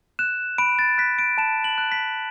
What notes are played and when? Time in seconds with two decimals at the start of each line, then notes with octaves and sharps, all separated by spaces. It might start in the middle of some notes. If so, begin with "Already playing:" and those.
0.19 F#6 E7
0.58 B5 D7
0.79 A6
0.98 F#6 B6
1.19 D7
1.38 A5 E7
1.64 F#7
1.78 F#6
1.92 B6